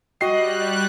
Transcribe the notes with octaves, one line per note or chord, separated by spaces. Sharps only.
G3 F#4 D#5 G5 F#6 C7